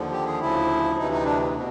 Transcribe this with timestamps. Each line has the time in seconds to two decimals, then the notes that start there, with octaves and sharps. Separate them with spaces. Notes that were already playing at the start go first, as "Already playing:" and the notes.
Already playing: D#2 D3 F3
0.12 G4
0.26 G#4
0.40 D2 C#3 F3 E4
0.97 D2 C3 E3 D#4
1.11 D#4
1.25 D4
1.55 B2